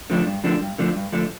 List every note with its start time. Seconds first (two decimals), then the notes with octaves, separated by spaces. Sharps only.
0.10 D3 F3 A3 D4
0.27 G2
0.44 D3 F3 A3 D4
0.61 G2
0.78 D3 F3 A3 D4
0.95 G2
1.12 D3 F3 A3 D4